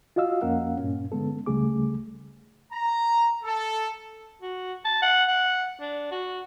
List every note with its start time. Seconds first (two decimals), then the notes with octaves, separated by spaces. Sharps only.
0.16 F4 F#4 D#5 F5 E6
0.41 F2 A#3 C#4 A#4 F5 F#5
0.77 G2 A#2 C#4
1.12 D3 G#3 B3 A4
1.46 C#2 C#3 G3 A3 G#4 D6
2.73 A#5
3.43 A4
4.42 F#4
4.85 A5
5.02 F#5
5.28 F#5
5.80 D4
6.11 F#4